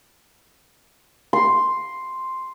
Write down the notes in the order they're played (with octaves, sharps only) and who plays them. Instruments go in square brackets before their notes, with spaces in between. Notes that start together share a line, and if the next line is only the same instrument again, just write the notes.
[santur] C6